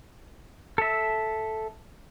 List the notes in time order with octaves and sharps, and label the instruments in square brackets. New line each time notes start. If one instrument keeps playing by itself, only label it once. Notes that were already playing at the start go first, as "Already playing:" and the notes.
[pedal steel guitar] A4 E5